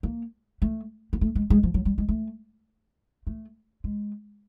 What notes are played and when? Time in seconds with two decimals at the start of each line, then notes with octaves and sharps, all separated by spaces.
0.03 A#3
0.62 A3
1.13 A#3
1.21 A3
1.35 G#3
1.50 G#3
1.63 F3
1.74 F#3
1.85 G3
1.98 G#3
2.09 A3
3.27 A3
3.84 G#3